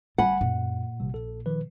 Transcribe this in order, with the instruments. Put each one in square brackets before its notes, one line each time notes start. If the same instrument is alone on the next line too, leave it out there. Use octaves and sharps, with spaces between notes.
[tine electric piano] G1 G#5 B5 [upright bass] G3 [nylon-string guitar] F#5
[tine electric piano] F#2 [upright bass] A#2
[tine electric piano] G#1 C3 G3
A#1 A4
D#3 F3 B4